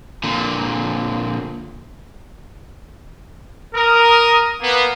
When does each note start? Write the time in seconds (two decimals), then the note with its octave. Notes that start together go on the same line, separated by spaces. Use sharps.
0.24 A#2 D3
3.74 A#4 D#6
4.61 A#3 B3